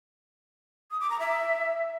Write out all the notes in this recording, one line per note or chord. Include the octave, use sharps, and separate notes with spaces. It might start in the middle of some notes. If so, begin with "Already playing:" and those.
D#6
D6
A#5
E5